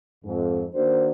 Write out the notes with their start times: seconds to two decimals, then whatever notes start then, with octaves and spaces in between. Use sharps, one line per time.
0.24 F2 G#2
0.74 D#3 A#3 D4 F#4 A#4 C5